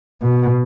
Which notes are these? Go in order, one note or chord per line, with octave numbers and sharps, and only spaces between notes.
B2